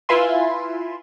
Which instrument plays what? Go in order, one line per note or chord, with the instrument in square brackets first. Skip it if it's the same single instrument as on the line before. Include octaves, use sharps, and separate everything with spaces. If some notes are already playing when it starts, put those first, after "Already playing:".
[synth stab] E4 F4 B4 E5 G#5 C6